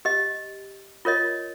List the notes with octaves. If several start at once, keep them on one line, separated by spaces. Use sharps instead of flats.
G4 D#5
F4 A#4 C#5 D#5